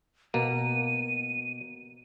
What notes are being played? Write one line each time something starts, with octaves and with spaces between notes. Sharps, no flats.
B2 A#3 D#7